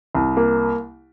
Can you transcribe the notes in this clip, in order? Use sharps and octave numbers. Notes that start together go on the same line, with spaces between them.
C2
A#3